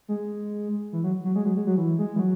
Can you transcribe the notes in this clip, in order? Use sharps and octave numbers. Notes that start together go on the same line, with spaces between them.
G#3
E3
F#3
F#3
G#3
F#3
G#3
F#3
E3
G#3
E3
F#3